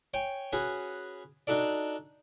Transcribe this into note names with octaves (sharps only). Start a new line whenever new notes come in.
C#5 G5 G#5
C#4 F#4 G#4 B4
D4 D#4 F#4 A4 D5